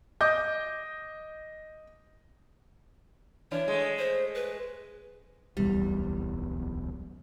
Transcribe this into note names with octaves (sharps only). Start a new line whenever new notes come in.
D#5 D6 G6
E3 D4 C#5
G#3 A3
C5
B4
D1 B1 E2 G3